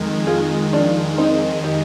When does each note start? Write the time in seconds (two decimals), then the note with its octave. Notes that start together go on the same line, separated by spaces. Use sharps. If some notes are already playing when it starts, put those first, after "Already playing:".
Already playing: F2 D#3 G#3
0.27 F4 G#4
0.73 D4 F4
1.18 C4 D#4
1.64 D#4 G4